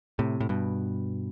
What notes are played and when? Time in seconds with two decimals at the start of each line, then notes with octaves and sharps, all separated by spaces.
0.19 A2 C3
0.40 A2
0.49 G2 B2